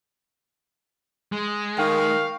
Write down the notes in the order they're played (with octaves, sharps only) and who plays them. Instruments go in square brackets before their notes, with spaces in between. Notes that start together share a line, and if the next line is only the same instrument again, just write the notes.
[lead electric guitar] G#3
[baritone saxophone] D#3 [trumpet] F5 [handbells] G5 C#6